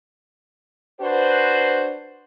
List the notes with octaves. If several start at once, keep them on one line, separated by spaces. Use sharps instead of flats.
D4 F#4 B4 C5